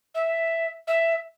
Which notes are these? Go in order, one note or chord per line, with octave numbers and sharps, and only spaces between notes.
E5
E5